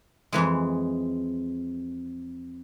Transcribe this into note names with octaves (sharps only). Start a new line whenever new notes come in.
F2 E3 G#3